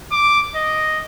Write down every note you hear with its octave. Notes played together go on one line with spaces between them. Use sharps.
D6
D#5